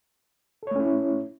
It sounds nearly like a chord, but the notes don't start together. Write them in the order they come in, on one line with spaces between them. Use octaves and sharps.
A4 C#5 A3 C#4 E4